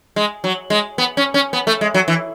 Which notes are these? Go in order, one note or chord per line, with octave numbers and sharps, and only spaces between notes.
G#3
F#3
G#3
B3
C#4
C#4
B3
A3
G#3
F#3
E3